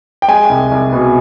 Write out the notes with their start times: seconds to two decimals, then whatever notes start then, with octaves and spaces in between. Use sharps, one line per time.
0.22 G5
0.28 G#3 G#5
0.49 C2
0.72 C2
0.93 B2